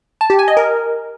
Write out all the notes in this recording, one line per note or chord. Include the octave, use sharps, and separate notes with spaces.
A5
G4
G#5
D#5
A#4